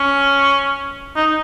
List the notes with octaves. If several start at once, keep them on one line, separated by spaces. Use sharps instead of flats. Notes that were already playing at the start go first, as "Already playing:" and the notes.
Already playing: C#4
D#4